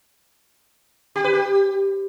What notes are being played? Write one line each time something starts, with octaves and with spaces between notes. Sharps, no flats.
G4
B4
G4